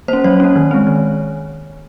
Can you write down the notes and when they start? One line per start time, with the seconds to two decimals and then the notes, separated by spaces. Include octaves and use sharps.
0.08 A#3 C#4 C5
0.24 F#3 C#5
0.40 A#3 C#4
0.56 D#3
0.71 G#3 C4
0.87 D#3